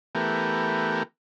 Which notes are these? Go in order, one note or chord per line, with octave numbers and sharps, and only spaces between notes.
E3 A3 B3 G4 A#4